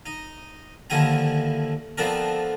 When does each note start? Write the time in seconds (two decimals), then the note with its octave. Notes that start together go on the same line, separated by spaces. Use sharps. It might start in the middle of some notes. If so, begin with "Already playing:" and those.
0.06 D#4
0.90 D#2 D3 F3 E4 G#5 A#5
1.98 F3 B3 C4 D4 A4 A#4